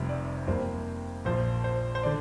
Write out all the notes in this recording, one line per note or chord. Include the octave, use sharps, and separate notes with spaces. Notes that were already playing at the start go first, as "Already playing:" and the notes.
Already playing: F1 F2 C3 G3
D5
F2 C3 G3 A#3 C5
A#1 A#2 F3 C5
C5
C5
D3 D5